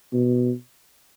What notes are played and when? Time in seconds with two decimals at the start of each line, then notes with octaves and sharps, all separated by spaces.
0.13 B2